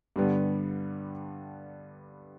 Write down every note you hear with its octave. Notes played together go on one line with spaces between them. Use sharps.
G2 D3 G3 B3